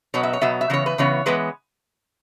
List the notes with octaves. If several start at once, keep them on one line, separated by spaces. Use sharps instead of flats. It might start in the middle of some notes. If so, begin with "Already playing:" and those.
B2 F#3 B3 C#5
E5
C#5
B2 F#3 B3 E5
E5
C#3 E3 B3 C#5
B4
C#3 E3 B3 C#5
E3 G#3 B3 B4